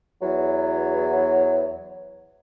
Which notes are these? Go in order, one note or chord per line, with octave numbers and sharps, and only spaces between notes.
E2 F#3